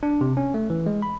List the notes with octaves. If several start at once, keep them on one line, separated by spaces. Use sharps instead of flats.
D4
C3
C#4
A3
E3
G#3
B5